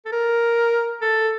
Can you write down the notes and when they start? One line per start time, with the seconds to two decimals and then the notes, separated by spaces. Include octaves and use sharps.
0.06 A4
0.12 A#4
1.02 A4